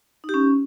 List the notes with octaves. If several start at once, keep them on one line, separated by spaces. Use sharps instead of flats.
D#4
G4
C#4